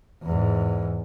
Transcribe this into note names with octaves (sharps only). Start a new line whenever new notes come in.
E2 G#2